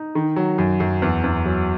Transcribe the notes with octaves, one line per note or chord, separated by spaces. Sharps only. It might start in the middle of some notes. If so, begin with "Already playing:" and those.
Already playing: D#4
D#3
F#3
F#2
F#2
E2
E2
F#3